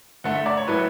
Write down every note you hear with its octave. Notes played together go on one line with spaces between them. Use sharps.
D3 A3 F#5
E5
D5
C#5
A2 F#3 A3 B4